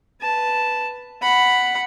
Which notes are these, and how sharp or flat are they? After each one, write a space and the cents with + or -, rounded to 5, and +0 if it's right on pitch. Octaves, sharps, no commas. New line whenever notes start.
B4 +0 A5 +0
F#5 +0 B5 +0